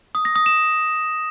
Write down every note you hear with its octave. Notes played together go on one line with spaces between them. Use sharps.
D#6
A#6
D#6
E7